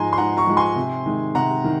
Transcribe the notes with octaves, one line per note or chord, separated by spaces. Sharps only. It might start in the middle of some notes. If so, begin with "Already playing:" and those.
Already playing: G#2 F3 G#3 D#4 G#5 A#5 C6
C6
G#2 F#5 A#5
A#5 C#6
F3 G#3 D#4
G#5 C6
C3
D#3 G#3
C3 F#5 A#5
D#3